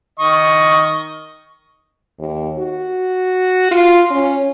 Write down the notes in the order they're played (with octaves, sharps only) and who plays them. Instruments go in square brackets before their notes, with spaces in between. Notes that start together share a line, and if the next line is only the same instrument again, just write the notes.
[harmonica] D#3 D#5 C#6
[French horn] D#2
F#4
F4
C#4